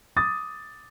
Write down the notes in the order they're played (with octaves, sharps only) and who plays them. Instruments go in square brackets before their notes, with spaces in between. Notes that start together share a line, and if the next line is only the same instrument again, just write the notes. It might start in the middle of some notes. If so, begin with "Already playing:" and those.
[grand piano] D6 D#6 A6